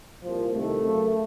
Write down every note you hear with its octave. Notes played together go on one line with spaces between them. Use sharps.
C2 A#2 F3
C2 C3 D#3 A3
F#2 C#3